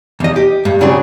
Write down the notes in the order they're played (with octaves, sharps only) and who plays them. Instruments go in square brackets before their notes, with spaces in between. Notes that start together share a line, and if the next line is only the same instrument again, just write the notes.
[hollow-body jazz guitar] E2 D#5
G4
G2
C#3 F#3 C4 D4 G#4